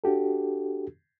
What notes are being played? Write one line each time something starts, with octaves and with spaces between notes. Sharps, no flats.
D4 F#4 G4 A4